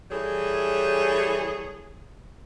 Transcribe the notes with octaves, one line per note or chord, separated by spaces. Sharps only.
E3 G3 G#4 A4 C#5